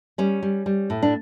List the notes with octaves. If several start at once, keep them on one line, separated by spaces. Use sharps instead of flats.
G3 C#4
G3
G3
A2
D4